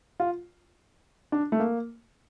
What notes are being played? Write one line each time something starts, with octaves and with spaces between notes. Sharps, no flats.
F4
D4
A3
A#3